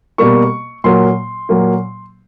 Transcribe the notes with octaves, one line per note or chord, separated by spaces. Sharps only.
B2 G3 A#3 C#6
A#2 F#3 A#3 C6
A#2 F#3 A#3